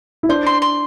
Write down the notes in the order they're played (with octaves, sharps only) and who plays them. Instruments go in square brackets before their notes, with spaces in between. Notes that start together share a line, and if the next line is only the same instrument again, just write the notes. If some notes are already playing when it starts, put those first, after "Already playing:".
[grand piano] E4
[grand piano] D4 [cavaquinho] C5
[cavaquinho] C6
C6